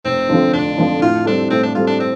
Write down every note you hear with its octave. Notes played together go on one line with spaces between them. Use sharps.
F1 C4
F2 D3 F3
F1 D4
F2 D3 F3
A2 F4
G3 C4 D4 A4
A2 C4
D4
G3 C4 F4 A4
D4
C4